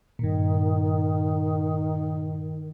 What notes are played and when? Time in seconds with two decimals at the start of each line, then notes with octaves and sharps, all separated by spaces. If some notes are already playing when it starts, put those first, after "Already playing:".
0.19 G2 A#2 D#3